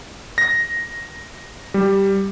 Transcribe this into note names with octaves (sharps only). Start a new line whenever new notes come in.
A#6
G3